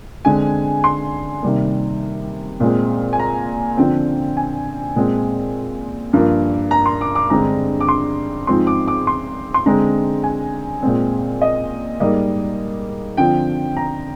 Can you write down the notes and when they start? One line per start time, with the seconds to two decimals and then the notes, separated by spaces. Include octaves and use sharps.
0.25 D3 G#3 C4 G#5
0.84 C6
1.42 C3 D#3 G3 A#3
2.60 A#2 G#3 C4
3.13 G#5
3.19 A#5
3.77 D3 F3 C4 G5
4.37 G#5
4.96 A#2 G#3 C4
6.13 G2 F3 A#3
6.71 A#5
6.86 C6
7.01 D6
7.15 D6
7.30 G2 D3 G#3 C4 A#5
7.80 D6
7.88 C6
8.47 G#2 F3 G#3 C4 C6
8.67 D6
8.88 D6
9.07 C6
9.54 C6
9.66 D3 G#3 C4 A#5
10.24 G#5
10.83 A#2 G#3 C4
11.41 D#5
12.00 G#2 G3 A#3 D#5
13.17 D3 F3 C4 G5
13.77 A#5